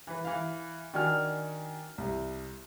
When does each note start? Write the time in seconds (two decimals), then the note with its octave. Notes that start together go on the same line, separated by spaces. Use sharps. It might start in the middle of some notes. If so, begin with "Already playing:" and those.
0.07 E3 B4
0.25 E3 F5
0.94 D#3 D4 F#4 G#5 F6
1.98 C2